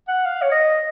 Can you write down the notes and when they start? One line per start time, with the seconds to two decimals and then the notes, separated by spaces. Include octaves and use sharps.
0.08 F#5
0.26 F5
0.42 C#5
0.52 D#5